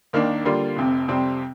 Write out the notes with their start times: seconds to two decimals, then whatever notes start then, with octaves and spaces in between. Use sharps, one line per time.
0.13 D#2 D#3 A#3 D4
0.44 D3 G3 A#3 F4
0.76 F1 F2 C3
1.08 F2 C3 G3 C4